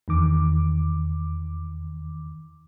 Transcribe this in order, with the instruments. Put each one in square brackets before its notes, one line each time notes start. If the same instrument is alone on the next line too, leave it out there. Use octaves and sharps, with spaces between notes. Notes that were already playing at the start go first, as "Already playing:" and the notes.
[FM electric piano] E2 D#3 D6